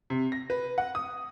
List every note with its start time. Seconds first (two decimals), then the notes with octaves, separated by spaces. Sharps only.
0.10 C3
0.32 A#6
0.50 B4
0.78 F#5
0.95 D#6